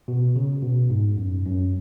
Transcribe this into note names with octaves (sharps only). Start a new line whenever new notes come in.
B2
C#3
B2
G#2
F#2
F#2